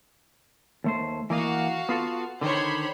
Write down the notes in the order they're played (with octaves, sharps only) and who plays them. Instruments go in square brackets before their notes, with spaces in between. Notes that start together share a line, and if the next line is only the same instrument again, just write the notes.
[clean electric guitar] D#2 A3 C5
[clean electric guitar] E3 A#3 D#5 [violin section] F#4 F5
[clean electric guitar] B3 F4 A4
[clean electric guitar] D3 D#3 [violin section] C5 C#5 B5